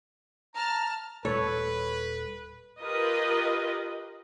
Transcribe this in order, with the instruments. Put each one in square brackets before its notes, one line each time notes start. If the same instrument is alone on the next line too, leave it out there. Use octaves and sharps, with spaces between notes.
[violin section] A5 F6 [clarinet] A#5
[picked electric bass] D#1 A#2 G3 [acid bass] A4 [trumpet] B4 [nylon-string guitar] C#5
[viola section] F4 G4 A#4 B4 D#5